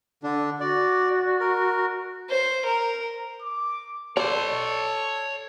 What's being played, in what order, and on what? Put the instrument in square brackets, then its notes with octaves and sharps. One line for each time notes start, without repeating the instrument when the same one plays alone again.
[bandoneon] D3 D4
[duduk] F#4 [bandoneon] D5
[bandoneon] A#4
[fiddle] C5
A#4
[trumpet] D6
[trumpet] A4 [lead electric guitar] C#5 C6 [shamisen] D5